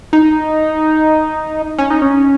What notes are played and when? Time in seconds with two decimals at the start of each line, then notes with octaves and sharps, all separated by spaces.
0.13 D#4
1.79 C#4
1.90 D#4
2.02 C#4